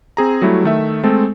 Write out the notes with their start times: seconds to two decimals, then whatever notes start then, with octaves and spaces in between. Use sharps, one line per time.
0.17 C4 G#4 A#5
0.42 F#3 G3 A3 E4
0.64 D#3 A3 E5
1.03 G#3 A3 C4 A4